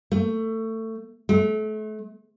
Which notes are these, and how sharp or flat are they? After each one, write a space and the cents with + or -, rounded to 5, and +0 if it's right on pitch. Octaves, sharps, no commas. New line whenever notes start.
A3 +25
A3 -35